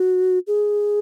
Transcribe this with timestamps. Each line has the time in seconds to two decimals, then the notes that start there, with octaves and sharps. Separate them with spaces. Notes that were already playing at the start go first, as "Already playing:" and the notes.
Already playing: F#4
0.47 G#4